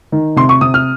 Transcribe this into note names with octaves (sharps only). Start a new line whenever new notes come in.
D#3
C3 C6
C#6
C3 D#6
F6